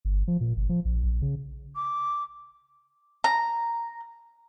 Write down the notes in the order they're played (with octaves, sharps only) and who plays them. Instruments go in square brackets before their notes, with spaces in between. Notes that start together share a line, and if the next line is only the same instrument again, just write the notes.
[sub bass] G1
F3
A#2
G1
F3
A#1
A#1
C#3
[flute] D6
[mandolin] A#5